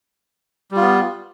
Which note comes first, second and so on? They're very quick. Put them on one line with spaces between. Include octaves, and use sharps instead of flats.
G3 F4 B3